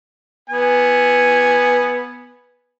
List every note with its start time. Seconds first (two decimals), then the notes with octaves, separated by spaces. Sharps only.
0.50 B3 G#5